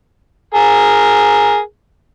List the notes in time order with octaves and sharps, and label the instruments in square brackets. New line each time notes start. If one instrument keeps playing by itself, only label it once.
[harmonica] G#4 A#4